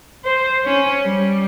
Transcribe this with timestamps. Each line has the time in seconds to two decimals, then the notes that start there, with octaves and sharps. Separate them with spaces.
0.25 C5
0.65 C#4
1.04 G3